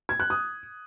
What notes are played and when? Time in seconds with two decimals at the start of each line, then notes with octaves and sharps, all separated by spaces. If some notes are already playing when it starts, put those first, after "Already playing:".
0.09 G#6
0.20 F#6
0.30 D#6